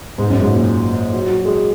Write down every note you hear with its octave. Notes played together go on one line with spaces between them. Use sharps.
G#2
F#2
G#2
A#2
F#3
F#3
G#3